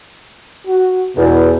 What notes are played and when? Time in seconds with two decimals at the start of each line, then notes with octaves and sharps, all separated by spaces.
0.67 F#4
1.17 E2 B2